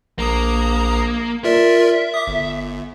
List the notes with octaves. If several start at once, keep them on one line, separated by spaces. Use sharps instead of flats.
A#1 A#3 A#5 D#6
F4 A#4 D5 E5
D6 D#6
G1